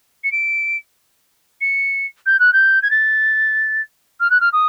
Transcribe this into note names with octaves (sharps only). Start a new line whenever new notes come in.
C#7
D7
C#7
G6
F#6
G6
G#6
A6
F6
F#6
F6
D#6